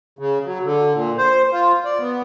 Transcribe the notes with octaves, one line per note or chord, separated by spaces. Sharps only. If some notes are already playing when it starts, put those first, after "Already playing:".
C#3
F#3
D3
A#2
C5
F4
D5
B3